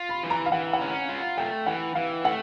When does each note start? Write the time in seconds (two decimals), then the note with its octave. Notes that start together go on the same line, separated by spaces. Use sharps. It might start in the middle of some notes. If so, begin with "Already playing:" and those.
Already playing: F4
0.09 B5
0.23 E3
0.30 A#5
0.46 F5
0.52 E3 F#5
0.73 F#5
0.81 C#4
1.09 F4
1.38 A3 G5
1.66 E3 F#5
1.95 E3 F5
2.24 A3 F#5